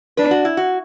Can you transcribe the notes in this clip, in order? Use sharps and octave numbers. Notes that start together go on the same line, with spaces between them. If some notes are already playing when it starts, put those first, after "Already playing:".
D4 B4
F#4
E4
F#4